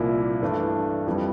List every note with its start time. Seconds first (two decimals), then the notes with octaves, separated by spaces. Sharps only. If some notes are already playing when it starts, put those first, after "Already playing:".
Already playing: C2 A#2 F3 A#3 E4
0.42 G2 E3 A3 D4
1.07 F2 E3 G3